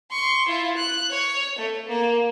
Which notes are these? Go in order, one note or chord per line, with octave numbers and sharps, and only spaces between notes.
C6 C#6
E4 F4
F#6
C#5
A3
A#3